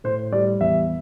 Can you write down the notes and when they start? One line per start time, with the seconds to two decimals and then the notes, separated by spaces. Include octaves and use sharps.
0.04 A2 C5
0.32 G3 D5
0.60 E2 E5